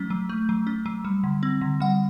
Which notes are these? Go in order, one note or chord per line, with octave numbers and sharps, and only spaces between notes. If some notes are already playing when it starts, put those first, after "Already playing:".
Already playing: F#3 A3 C#4
F#3
A3
F#3
C#4
F#3
G3
D3
C4
D3
G3 F#5